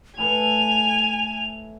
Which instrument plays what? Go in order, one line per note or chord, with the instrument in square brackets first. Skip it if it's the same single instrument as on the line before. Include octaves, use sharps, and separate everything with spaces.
[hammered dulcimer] A2 A4 B4 [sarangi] G#5 [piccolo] F7